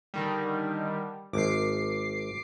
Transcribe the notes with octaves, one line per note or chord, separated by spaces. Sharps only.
D3 D#3 G3
G#1 D6 C7